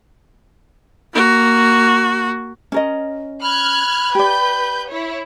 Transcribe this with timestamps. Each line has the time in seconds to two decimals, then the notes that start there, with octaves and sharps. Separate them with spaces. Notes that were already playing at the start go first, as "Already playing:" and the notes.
1.13 A#3 F#4
2.72 C#4 A#4 D#5
3.42 B5 F6 F#6 G#6
4.15 G4 B4 D5 G6
4.88 E4 C#5